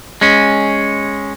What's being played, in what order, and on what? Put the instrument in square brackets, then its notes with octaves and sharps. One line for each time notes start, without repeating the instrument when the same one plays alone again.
[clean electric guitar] G#3 C#4